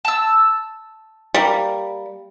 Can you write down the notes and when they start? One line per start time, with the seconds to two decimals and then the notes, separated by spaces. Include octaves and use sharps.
0.05 A5 E6
1.34 G3 A#3